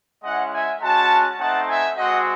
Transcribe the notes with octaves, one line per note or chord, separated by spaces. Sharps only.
G#3 C#4 E4 D#5 F#5
E5 G#5
G#3 C#4 F#4 F#5 A5
A3 C4 D#4 F#5 A5
E5 G#5
G#3 C4 F#4 D#5 F#5